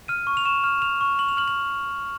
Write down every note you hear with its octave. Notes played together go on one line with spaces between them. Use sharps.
F6 D#7
C#6
F7
C#6 E7
F6
F6 F7
C#6
C#6 F#7
F7
F6 F#7
F#7